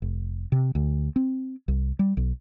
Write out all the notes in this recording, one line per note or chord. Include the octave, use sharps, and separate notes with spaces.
F1
C3
D2
C4
C2
G3
B1